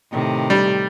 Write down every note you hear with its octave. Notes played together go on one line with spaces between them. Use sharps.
A2 C3 D#3
G3